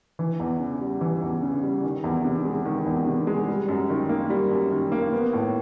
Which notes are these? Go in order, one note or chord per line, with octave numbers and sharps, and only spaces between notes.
E3
E2
C#3
G3
E3
E2
C#3
G3
D#3
E2
C3
G#3
D#3
E2
C3
G#3
G3
F#2
D#3
A#3
G3
F#2
D#3
A#3
B3
A2